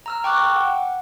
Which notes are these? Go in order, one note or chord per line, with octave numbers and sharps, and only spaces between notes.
A#5 E6 F6
G5 C#6 D6 F#6
F#5